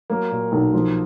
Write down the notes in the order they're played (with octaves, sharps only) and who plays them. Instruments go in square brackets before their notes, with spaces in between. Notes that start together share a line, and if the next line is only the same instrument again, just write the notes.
[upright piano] F#3 A#3
A#2
B1
F3